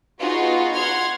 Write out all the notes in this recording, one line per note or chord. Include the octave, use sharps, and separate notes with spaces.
B3 D#4 F4 F#4 G#4
F#5 C6 F6 G#6